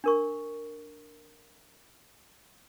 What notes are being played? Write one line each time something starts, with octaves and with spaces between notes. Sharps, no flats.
D4 A#4 C#6